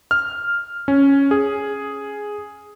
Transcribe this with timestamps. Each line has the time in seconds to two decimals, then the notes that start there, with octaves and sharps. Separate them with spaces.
0.11 F6
0.88 C#4
1.31 G#4